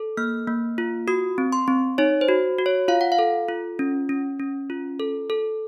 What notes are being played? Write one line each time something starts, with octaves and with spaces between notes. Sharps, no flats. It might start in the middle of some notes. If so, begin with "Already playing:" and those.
Already playing: A4
A#3 F6
A#3
F4
F#4 D#6
C4
C6
C4
D#4 C#5
C5
F#4
F#4
C#5
F4 F5
F#5
F5
A4
F4
C#4
C#4
C#4
F4
A4
A4